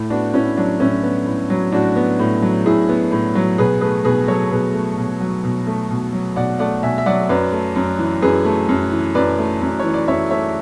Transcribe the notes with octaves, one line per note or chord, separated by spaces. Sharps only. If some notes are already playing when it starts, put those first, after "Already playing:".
Already playing: A2
B3 D4 F#4
A2 C#4 E4
F#3 D4
A2 C#4 E4
B3
A2
F#3
A2 D4 F#4
B3
A2
F#3
A2 E4 G#4
B3
A2
F#3
B2 G#4 B4
A3 G#4 B4
B2 G#4 B4
F#3 A4 C#5
B2 G#4 B4
A3
B2
F#3
B2
A3
B2
F#3
B2 D5 F#5
A3 D5 F#5
B2 E5 G#5
E5
F#3 D5 F#5
F#2 B4 D5
A3
F#2
E3
F#2 G#4 B4
A3
F#2
E3
F#2 B4 D5
A3
F#2
E3 C#5
D5
F#2 C#5 E5
A3 C#5 E5